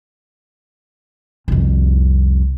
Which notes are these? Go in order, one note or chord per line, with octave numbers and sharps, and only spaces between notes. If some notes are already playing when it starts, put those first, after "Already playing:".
C2 F2